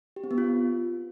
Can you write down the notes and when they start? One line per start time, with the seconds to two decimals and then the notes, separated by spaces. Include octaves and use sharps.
0.16 G4
0.24 C4
0.31 B3
0.38 F4